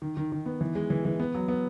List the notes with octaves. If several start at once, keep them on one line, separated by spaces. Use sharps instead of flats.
D#3
D#3
D#3
B3
E3
G#3
E3
E3
B3
F#3
B3